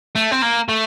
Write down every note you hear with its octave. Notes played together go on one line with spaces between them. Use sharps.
A3
C4
A#3
A3